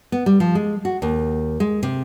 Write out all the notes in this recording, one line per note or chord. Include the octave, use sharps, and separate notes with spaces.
B3
G3
F3
G#3
F#4
D#2
G#3
C3